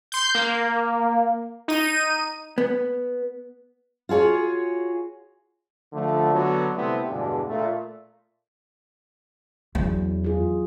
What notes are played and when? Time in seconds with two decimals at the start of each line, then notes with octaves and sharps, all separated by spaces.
0.12 C6 G6
0.35 A#3
1.68 D#4 D#7
2.58 B3
4.09 F4 F#4 G#4 C#5
5.93 D3 F3 A3
6.33 D3 F#3 B3
6.75 C3 G3 A3 B3 C4 E4
7.09 E2 G2 B2 D3 G#3 D4
7.48 A#2 A3
9.75 E2 E3 F#3
10.24 F4 G#4